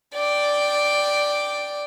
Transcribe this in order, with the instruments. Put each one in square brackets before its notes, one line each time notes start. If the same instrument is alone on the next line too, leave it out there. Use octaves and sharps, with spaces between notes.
[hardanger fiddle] D5 G5